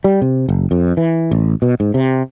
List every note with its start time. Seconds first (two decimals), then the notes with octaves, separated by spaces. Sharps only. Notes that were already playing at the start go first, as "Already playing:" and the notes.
0.04 G3
0.21 C3
0.49 F#1
0.71 F2
0.97 E3
1.31 A1
1.62 B2
1.80 G#2
1.94 C3